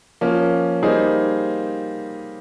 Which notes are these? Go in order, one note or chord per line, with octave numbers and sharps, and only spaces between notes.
F3 A#3 C#4
G3 A#3 D#4 G#4 C5